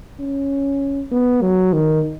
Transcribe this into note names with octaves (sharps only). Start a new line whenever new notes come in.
C#4
B3
F#3
D#3